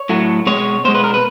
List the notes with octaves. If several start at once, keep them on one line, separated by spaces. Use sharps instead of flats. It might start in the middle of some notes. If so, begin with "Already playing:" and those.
Already playing: C#5
A2 F#3 A3
B2 G#3 C#5
B2 G#3 C5
B4
A#4
B4